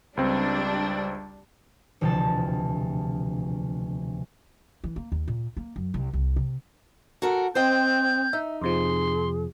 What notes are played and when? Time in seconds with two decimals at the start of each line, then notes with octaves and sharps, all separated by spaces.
0.17 C#2 G3 C4 D4
2.01 E1 D2 C3 F3 A4 A5
4.84 E3
4.96 A#3
5.12 D#2
5.28 A#2
5.57 A#3
5.76 F#2
5.94 C2
6.13 C2
6.36 C3
7.22 F#4 A4 A#4
7.55 C4 C5 D#5 G5 G6
8.33 D#4 E5
8.62 F2 C3 F3 G#4 C6